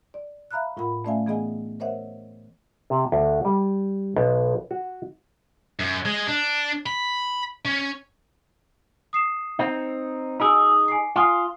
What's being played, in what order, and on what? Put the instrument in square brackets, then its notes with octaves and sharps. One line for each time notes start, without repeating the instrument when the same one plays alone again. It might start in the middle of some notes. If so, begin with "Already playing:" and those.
[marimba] D5
E5 F5 A#5 B5 F6 F#6
A2 F4 A#4 F#5 B5
A3 C#4 D5 E5 F5 G#5
E3 B3 G#4 D#5 F#5 G#5
A#4 C5 C#5 D#5 E5 F#5
[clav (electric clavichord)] C3
D2
G3
B1
F#4
[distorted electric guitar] F#2
G#3
D4
B5
C#4
[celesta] D#6 C7 E7
[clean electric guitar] C4 D#4
[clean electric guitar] D#4 G#4 [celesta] F#4 G#5 E6
[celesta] G#5 D6 C7
[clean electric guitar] F4 [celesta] G#5 D#6 C7